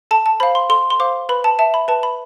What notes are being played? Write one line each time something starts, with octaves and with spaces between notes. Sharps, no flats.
A4 A5
A5
C5 F5 B5
C6
A4 C6
C6
C5 F5 D6
B4 B5
A5
E5 A5
B5
B4 A5
B5